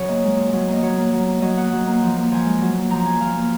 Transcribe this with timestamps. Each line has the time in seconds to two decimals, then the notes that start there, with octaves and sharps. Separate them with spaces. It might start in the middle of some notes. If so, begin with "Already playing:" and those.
Already playing: C#3 F#3 C#5
0.08 A#3 D#5
0.24 G#3
0.37 A#2
0.53 F#3
0.68 A#3
0.73 D#5
0.82 F#3 C#5
0.98 A#3
1.12 F#3
1.27 A#3
1.42 F#3 D#5
1.56 A#3 F#5
1.72 F#3
1.87 A#3
2.02 F3
2.17 A#3
2.32 F3 G#5
2.46 G#3
2.61 F#3
2.76 A#3
2.90 F3 A#5
3.05 A#3 G#5
3.21 F3 F5
3.35 A#3